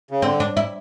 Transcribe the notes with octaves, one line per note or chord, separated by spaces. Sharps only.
C#3
D3 C4
D4
E4